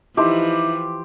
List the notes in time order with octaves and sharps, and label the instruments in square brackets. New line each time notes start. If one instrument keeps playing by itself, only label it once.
[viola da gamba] E3 F3 [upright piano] D#4 E4 [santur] G4 C6